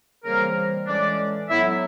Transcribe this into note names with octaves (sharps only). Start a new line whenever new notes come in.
C#3 E3 G3 A#3 C4 A#4
A2 E3 G#3 C#4 D4 D5
A2 F#3 B3 E4 E5